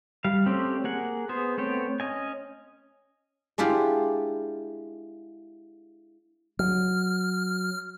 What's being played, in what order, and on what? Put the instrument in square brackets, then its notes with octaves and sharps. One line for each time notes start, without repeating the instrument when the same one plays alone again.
[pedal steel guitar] G3 F5
A3 C4 C#4 G4 D5
A#3 G#4 F#5
B3 G#4 C5
A3 B3 C4 C#5 G5
C#4 D#5 G#5
[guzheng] G#3 D4 E4 F4 G4
[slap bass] F#3 [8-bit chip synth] F6